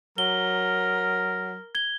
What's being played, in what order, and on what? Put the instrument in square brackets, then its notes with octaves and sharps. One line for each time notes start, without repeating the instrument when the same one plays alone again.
[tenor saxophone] F#3 [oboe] A#4 [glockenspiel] G7
[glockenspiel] G#6 G7